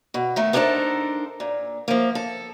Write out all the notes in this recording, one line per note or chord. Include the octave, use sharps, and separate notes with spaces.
B2
D#3 A3 D#4
B3 D4 D#4 A4 A#4 C5
A#2
F3 A#3
A4